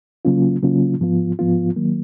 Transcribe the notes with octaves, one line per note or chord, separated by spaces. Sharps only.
C#3 F#3 A#3 C#4 F4
C#3 F#3 A#3 C#4 F4
G#2 F3 B3 F4
G#2 F3 B3 F4
D#3 F#3 A#3